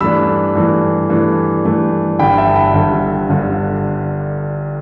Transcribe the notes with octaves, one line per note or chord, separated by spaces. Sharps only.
G2 E3 A3 D4 B5 E6
G2 E3 A3 D4
G2 E3 A3 D4
G2 E3 A3 D4
G1 G2 D3 G5 B5
E5 A5
G5 B5
G1 G2 D3
G1 G2 D3